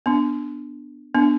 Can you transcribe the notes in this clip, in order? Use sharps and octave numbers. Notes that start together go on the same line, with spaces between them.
B3 D4
B3 D4